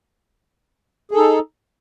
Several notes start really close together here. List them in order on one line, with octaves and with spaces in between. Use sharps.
G#4 A4 D#4